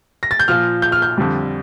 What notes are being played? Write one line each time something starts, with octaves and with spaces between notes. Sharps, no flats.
A#6
A6
G6
A#2 F3 F6
G6
F6
G6
F2 D3 G3